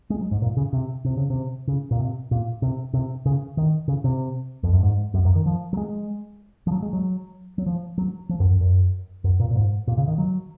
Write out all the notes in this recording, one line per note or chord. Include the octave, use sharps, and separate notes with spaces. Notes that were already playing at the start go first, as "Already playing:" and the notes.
G#3
F#3
G#2
A#2
C#3
C3
C3
C#3
C3
C#3
A#2
C3
A#2
C3
C3
C#3
D#3
C#3
C3
F2
F#2
G#2
F#2
F#2
D#3
F3
F#3
G#3
F3
F#3
G#3
F#3
F#3
F3
F#3
F3
F#2
F#2
F#2
F#2
A#2
A#2
G#2
A#2
C#3
D#3
F#3